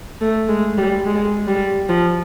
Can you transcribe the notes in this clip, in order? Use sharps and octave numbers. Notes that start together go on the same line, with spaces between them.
A3
G#3
G3
G#3
G3
F3